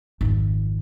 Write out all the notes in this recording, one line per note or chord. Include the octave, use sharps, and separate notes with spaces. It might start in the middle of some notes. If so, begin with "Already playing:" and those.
G#1 F2